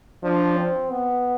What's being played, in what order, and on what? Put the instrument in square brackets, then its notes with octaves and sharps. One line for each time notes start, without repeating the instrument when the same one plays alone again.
[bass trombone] F3 [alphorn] D4
[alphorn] C4
B3